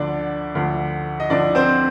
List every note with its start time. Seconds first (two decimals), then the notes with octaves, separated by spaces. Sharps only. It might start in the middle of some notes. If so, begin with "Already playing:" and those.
Already playing: D2 D3 F3 D4 D5
0.55 D2 D3 F3
1.20 D#5
1.30 D2 D3 F3 D4 D5
1.55 C4 C5